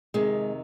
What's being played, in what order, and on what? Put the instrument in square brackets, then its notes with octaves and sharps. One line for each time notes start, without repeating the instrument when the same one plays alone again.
[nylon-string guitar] F2 C3 D#3 G#3